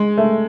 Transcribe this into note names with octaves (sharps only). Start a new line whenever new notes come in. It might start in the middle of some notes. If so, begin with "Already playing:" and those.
Already playing: G#3
A3